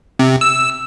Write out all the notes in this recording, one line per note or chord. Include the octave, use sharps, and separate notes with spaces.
C3
E6